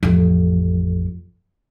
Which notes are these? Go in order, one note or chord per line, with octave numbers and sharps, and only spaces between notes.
A1 F2